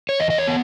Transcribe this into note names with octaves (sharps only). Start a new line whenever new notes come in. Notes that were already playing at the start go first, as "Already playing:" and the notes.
C#5
E2 D#5
D#5
C#5
B3